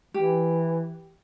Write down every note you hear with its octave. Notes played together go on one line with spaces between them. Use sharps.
E3 G4